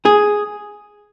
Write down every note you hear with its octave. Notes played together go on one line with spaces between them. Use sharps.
G#4